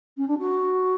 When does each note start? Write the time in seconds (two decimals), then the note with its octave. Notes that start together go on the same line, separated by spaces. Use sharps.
0.17 C#4
0.28 D4
0.39 F#4